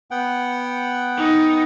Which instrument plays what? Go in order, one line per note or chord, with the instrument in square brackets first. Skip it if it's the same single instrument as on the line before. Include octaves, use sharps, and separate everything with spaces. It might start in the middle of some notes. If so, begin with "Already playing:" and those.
[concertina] B3 F#5 G5
[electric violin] D#4